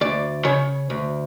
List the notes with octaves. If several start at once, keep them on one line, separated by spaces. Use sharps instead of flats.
D2 D5
C#3 C#5
D2